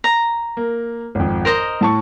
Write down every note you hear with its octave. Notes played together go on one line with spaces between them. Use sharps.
A#5
A#3
G#1 F2
A#4 C5 D#5 A#6
A2 A5 C#6